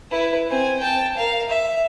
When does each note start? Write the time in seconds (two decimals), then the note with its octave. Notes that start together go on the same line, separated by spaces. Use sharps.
0.11 E4 B4
0.49 C4 G#5
0.79 G5 A5
1.17 A#4 F5
1.49 E5